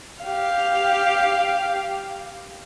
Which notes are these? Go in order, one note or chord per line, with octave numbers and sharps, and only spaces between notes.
G4 F5